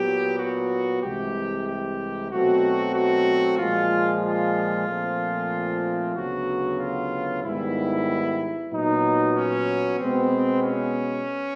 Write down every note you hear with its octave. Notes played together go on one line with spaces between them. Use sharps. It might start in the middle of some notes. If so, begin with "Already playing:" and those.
Already playing: A#2 F#3 B3 G4
F#4
C2 C3 E3 G#3 G4
G4
B2 F#3 A3 C4 F#4
F#4
A#2 F3 G#3 F4
F4
A#2 F3 A3 C4
D2 C#3 F#3 B3 F#4
F4
G#2 D#3 G3 B3 E4
A#2 F#3 B3 D#4
C#4
B2 G#3 B3 C4
C#4